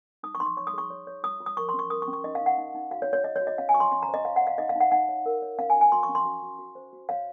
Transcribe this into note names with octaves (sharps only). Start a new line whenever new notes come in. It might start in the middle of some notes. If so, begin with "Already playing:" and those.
D#4 D#6
C#6
D#4 C6
C#6
C#5 C#6
D#6
G#4 C#6
C#5
C#5
F4 D#6
F4
D#6
A#4 C#6
C6
C#4
C#6
A#4 D#6
C#6
C#4
C#6
D#4 D#5
F5
D#4
F#5
D#4
D#4
F#4 F5
C#5
F#4
C#5
C#5 D#5
C#5
F#4
D#5
C#4 F5
G#5
F#4 C#6
C6
C#4 C6
A#5
C5
D#5
C#5 F5
F#5
C#5
F5
D#4 D#5
F5
D#4 F#5
D#4 F#5
C#5
A#4
C#5
C#4 F5
G#5
F#4
G#5
F#4 C6
C#6
C#4
C6
F#4
F#4
F#4
C5
F#4
C#5 F5